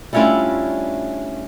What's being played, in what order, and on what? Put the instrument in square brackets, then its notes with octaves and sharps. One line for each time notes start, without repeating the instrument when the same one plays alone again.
[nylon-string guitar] G3 A3 C#4 D4 E4 F4